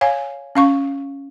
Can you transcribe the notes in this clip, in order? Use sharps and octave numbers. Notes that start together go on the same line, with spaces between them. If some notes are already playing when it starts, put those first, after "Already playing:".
C#5 F5 G#5
C#4 F5 C#6